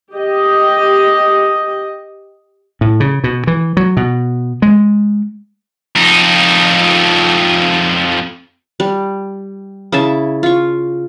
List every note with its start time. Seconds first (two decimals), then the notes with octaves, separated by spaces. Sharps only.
0.14 G4 D#5
2.81 A2
3.00 C#3
3.24 B2
3.47 E3
3.77 F#3
3.97 B2
4.62 G#3
5.96 F2 D#4
8.80 G3
9.92 C#3 E4 E5 A5
10.43 F4 C#6